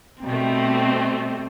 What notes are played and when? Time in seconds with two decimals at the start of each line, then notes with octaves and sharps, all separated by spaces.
0.23 B2 G3 A3 C4